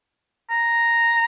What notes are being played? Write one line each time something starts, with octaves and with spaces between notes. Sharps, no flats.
A#5